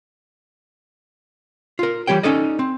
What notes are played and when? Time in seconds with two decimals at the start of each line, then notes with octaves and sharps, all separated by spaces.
1.79 F4 A#4
2.07 E3 G3 G4 C#5 G5
2.23 C#4 D#4 A4 D5 D#5
2.59 C4